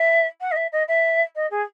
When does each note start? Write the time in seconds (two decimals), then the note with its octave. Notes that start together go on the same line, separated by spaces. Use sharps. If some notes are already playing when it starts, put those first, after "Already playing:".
Already playing: E5
0.41 F#5
0.51 D#5
0.56 E5
0.72 D#5
0.88 E5
1.35 D#5
1.50 G#4